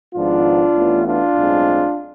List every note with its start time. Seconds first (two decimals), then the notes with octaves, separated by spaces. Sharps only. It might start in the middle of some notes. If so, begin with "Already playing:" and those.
0.14 G#1 G#2 F3 B3 D4 F4
0.75 A1 A2 E3 B3
1.05 D4 F4
1.35 B1 A2 G#3 C4